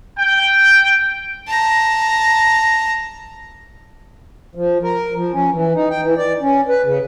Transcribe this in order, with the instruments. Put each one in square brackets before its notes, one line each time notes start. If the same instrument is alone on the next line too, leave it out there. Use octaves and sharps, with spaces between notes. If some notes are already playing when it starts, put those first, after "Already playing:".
[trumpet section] G5
[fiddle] A5 A#5
[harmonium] F3
A#4
F3
C#4
E3
D#4
G5
E3
D5
C#4
B4
C#3